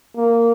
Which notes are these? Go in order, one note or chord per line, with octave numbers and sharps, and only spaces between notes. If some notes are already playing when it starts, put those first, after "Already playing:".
A#3